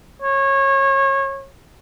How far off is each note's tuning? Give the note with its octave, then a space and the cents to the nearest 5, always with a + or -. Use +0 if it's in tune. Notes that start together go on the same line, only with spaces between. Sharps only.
C#5 -25